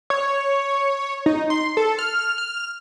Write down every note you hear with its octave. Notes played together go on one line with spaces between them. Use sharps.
C#5
D#4
C6
A4
F6
F6